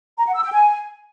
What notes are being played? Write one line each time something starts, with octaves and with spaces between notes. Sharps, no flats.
A#5
F#5
E6
G5
G#5